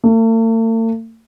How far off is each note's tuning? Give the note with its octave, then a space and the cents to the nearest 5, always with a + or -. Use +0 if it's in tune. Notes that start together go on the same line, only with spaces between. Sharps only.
A3 +45